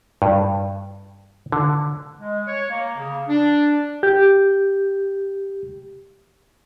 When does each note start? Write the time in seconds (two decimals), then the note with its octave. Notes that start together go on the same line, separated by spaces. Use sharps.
0.22 G2
1.52 D3
2.20 G#3
2.47 C#5
2.69 A#3
2.97 C#3
3.28 D4
4.03 G4 G6